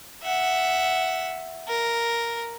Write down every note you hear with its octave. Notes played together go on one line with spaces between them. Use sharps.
E5 F#5
A#4